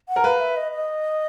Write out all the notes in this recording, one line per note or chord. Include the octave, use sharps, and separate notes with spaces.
F#5
A#4
B4 F5
E5
D#5
D#5